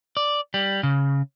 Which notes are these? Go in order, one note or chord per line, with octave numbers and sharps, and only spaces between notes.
D5
G3
C#3